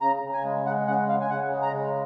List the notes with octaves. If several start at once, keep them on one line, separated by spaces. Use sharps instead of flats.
C#3 A#5
C#3
G#5
G#3
G#3 F#5
C#3 F#5
C#3 F5
G#5
C#3 F#5
G#3
A#5
C#3